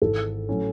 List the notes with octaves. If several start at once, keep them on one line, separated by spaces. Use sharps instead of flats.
G#1 G#2 E3 G#3 A4
A2 F#3 C#4 E4